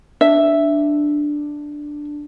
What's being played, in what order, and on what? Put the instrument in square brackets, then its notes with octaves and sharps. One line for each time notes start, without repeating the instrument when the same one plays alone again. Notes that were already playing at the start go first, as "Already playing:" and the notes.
[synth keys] D4 [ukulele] E5